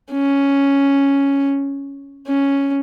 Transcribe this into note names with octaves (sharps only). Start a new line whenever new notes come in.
C#4
C#4